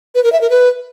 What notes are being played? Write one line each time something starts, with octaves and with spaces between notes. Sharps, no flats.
B4
A#4
E5
A#4
B4